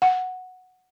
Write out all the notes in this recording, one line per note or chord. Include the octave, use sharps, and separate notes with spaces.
F#5